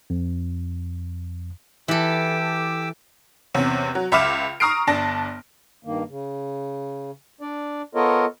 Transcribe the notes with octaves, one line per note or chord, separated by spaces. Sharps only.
F2
E3 G4 A4 D6 E6
E2 C3 C#4
F#3
C#2 E5 B5 D6 F6 E7
A#5 C#6 D#6 F6 C7 D7
G1 D4 A5 A#6
G2 D#3 A#3
C#3
D4 D5
B3 F4 A4 A#4 C#5 D#5